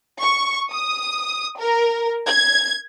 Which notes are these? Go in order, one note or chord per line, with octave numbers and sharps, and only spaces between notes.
C#6
D#6
A#4
G#6